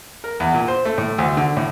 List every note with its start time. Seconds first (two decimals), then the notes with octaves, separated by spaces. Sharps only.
0.24 A#4
0.40 E2
0.54 A#2
0.68 C5
0.85 A3
0.98 A2
1.18 D2
1.37 D3
1.57 A2